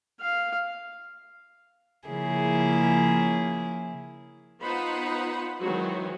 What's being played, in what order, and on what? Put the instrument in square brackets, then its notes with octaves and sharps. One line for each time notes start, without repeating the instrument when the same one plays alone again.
[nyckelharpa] F5
[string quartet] C#3 F3 A#3 E4 G#4
[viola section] B3 D#4 F4 C5 F#5 B5
D#3 E3 F#3 G#3 C4 F#4